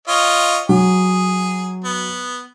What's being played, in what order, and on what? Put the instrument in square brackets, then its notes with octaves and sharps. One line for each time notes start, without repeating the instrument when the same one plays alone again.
[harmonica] F4 C#5 D#5
[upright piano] F#3 [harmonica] G#4
[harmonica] B3